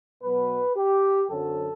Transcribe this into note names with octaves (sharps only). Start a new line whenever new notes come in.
B2 F#3 B3 B4
G4
F#2 D3 F#3 C4 A4